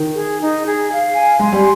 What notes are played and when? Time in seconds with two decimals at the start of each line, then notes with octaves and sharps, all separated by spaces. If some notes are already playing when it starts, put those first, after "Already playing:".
Already playing: D#3
0.16 G#4
0.41 D#4
0.66 G#4
0.90 F5
1.15 G#5
1.39 G#3 C6
1.53 G3